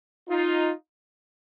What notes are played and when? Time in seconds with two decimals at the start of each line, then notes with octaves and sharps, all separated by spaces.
0.28 D#4 F4